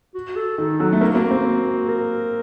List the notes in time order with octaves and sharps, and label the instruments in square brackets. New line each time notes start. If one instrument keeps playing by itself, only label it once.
[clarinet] F#4
A4
[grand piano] D#3 [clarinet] A4
[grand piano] F#3 [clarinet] A4
[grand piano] A3
[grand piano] A#3 [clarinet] F#4
[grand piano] A#3
C4
[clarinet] A#4